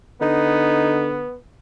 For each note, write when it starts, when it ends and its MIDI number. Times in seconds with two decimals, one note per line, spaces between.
0.21 1.24 50
0.21 1.36 59
0.21 1.07 63